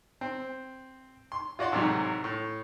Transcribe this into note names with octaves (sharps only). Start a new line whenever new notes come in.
C4
C6
F4 F#4 D5 C6
A1 G#2 C3 F#3
A2